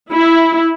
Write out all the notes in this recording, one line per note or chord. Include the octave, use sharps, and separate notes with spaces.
E4